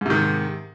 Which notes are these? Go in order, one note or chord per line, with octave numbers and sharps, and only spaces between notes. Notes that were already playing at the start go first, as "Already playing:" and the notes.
G#2 C3 D#3